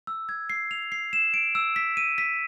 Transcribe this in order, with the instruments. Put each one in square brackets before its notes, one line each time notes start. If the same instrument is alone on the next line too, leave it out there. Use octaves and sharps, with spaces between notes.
[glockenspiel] E6
G#6
C7
F7
C7
E7
D7
E6
B6
D#7
B6